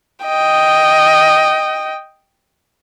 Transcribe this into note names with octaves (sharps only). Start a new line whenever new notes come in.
D#5 G5